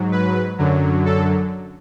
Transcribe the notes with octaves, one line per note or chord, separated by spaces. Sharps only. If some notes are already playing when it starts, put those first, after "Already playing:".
Already playing: G#2 F#3
B4
F#2 D3 F#3
A4